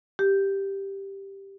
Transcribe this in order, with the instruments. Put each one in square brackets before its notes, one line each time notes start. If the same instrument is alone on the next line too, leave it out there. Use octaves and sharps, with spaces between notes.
[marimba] G4